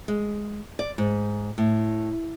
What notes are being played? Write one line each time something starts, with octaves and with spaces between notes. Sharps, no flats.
G#3
D5
G#2
A2